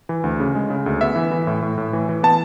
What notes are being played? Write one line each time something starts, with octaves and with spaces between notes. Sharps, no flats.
E3
D2
C#3
G#3
C#3
D2
B3 E5
E3
E3
A2
A2
A2
E3
E3
B3 A5